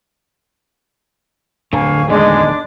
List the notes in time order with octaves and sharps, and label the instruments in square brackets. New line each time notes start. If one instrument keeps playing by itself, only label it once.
[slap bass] D1 F2 [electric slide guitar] D3 [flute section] F5 G#5 C#6
[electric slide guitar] E2 D#3 [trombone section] G#3 [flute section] D4 D#5 D6